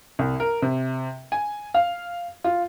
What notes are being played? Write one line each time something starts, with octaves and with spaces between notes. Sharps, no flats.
C2
A#4
C3
G#5
F5
F4